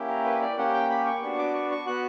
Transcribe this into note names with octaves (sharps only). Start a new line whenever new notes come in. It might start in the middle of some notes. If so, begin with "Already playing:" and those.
Already playing: A#3 C#4 E4 G4
A#4
B4
D5
A#3 C#4 G4 F#5
G5
B5
C#6
B3 D4 F#4 C#6
D6
C#6
C#6
B3 F#4 F#6